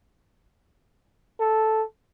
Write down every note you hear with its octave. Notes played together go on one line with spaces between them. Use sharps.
A4